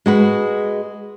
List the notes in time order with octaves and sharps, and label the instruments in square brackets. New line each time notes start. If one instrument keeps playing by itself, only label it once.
[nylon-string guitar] G#3 F#4 B4